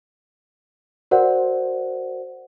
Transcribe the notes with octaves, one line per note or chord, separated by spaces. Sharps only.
F#4 A#4 C5 D5 F#5